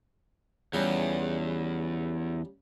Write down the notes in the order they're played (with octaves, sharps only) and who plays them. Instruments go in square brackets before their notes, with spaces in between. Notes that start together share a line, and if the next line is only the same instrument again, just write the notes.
[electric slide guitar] E2 [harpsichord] C#3 F3 G3